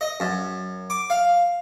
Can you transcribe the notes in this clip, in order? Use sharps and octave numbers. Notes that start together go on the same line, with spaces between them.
D#5
F#2
D6
F5